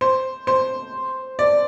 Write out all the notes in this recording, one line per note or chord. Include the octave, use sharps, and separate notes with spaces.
C5
C5
D5